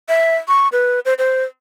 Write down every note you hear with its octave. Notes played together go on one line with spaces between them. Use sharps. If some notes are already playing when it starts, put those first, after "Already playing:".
E5
C#6
B4
C5
C5